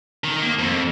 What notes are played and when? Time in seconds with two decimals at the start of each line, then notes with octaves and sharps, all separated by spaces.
0.24 D#3
0.42 A#3
0.59 F2